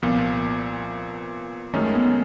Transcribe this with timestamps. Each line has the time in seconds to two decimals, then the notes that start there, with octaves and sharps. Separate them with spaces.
0.02 C2 A#2 F3 B3
1.73 F#2 D#3 G#3 A3 C#4
1.95 B3